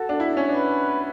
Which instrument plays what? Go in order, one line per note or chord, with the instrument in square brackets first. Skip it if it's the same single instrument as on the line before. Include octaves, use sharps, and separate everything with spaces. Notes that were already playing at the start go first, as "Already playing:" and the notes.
Already playing: [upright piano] F#4 [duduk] A4
[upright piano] D4
E4
C#4
[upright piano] D4 [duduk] B4